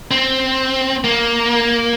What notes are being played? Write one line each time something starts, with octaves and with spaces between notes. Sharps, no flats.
C4
A#3